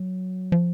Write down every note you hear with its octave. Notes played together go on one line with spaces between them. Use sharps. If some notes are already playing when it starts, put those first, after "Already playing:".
Already playing: F#3
F3